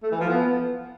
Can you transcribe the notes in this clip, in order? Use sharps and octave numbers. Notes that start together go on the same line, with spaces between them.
A3
E3
F3
B3